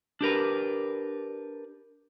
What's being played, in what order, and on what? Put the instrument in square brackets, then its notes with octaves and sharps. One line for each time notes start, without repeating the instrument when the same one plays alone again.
[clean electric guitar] D4 G4 A#4 B4